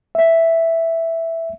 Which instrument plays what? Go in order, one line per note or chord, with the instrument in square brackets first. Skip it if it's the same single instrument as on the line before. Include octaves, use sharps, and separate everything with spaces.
[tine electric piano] E5